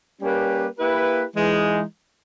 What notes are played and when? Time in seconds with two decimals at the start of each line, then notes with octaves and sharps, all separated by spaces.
0.20 G3 A#3 C#4 G4 B4
0.78 A#3 E4 G4 B4
1.36 E3 G#3 D#4